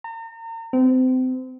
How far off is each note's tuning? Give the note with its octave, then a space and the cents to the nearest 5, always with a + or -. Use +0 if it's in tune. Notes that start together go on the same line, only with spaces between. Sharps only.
A#5 -40
C4 -30